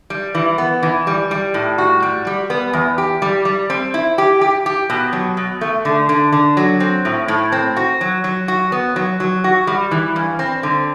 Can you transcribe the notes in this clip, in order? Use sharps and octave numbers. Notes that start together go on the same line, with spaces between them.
G3
E3
B3
E3
G3
G3
A2
F#4
G3
G3
B3
E2
G4
G3
G3
C4
E4
G4
G4
G4
B2
F#3
B2
A3
D3
D3
D3
F#3
C4
A2
A2
C4
F#4
F#3
F#3
F#4
B3
F#3
F#3
F#4
G3
E3
G2
C4
D3